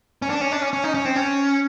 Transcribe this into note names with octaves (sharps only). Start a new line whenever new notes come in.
C#4
D4
C#4
D4
C#4
C#4
D#4
C#4
C4
C#4